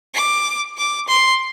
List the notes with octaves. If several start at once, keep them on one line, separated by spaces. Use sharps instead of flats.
D6
D6
C6